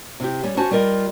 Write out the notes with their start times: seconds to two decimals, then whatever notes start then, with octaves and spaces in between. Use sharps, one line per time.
0.20 C3 E4 G4
0.43 G3 C#4
0.57 C#4 F#4 C5 A5
0.71 G3 F4 A#4 D#5